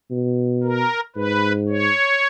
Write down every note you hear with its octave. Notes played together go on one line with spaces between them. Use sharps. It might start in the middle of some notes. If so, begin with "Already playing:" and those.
B2
A#4
G#2 B4
C#5